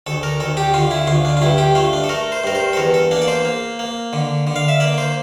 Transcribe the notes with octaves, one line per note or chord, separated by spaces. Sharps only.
D2 A4
A#4
D2 A4
G4
D3 F4
E4
D2 F4
D4
F4
G2 E4
G4
A3 F4
D4
A4
A3 A#4
C5
G2 A#4
C5
A4
E2 A#4
A4
A#3 D4
D5
C5
A#3
A#3
D3
D3
F5
E5
A#3 D5
C5